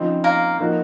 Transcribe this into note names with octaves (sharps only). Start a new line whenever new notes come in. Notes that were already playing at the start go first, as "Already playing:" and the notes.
Already playing: C#3 F3 C4 D#4
A#3
F3 A#3 D#4 F#4